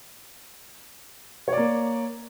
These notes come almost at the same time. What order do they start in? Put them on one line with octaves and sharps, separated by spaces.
C#5 D5 A#3